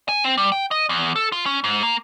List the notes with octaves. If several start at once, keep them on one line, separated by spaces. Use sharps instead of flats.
G#5
C4
G3
G5
D#5
E2
A4
F4
C#4
G#2
A#3